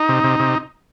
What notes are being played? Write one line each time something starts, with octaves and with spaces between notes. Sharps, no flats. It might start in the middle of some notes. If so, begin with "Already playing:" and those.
Already playing: D#4
C3
C3
C3